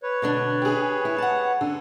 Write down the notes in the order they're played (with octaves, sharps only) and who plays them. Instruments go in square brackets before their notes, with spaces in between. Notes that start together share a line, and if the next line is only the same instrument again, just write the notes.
[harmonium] B4 C#5
[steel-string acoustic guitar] B2 D3 D4
[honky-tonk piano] G4 G#4
[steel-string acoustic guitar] E4
F#5 A5
[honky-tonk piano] D3 [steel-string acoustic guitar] G#5